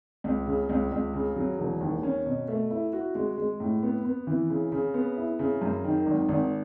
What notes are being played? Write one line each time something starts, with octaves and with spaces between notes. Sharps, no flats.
C#2
C#3
C#2
C#2
C#3
F#3
E1
D#2
C#4
B2
A3
E4
F#4
G#3
G#3
A2
B3
B3
E3
C#3
C#3
B3
E4
C#3
F#2
D#3
G#1
G#1